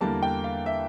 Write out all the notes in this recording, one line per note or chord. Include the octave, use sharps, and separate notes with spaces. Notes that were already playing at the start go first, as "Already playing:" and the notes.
E2 D3 G3 A#3 A5
G5
F5
E5